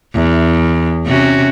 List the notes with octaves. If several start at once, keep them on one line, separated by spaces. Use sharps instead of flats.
E2
C3 C#4 F#4